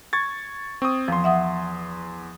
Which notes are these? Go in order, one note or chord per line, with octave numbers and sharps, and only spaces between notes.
C#6 G#6 A6
C4 C#6 D#6
E2 F3 C6
E5 F#5 D#6